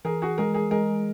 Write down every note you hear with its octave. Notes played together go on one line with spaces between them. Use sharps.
E3 G#4 A#4
F#4 G#4
G#3 G#4 A#4
G#4 A#4
G#3 G#4 A#4